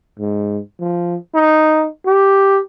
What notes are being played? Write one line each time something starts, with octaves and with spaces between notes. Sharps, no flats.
G#2
F3
D#4
G4